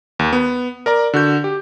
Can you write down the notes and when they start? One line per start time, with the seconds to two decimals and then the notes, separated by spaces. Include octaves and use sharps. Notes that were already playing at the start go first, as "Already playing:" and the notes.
0.19 D#2
0.33 B3
0.86 A#4 D5 A#5
1.13 D3 F#4 G6
1.44 G4